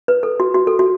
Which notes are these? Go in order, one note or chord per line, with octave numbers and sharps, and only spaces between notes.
B4
A4
F#4
F#4
A4
F#4